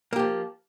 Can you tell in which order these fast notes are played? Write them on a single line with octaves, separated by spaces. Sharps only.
A#3 G4 F3